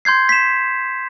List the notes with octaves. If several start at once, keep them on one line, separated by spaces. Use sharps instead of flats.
C6 G6 G#6 C7
B6 E7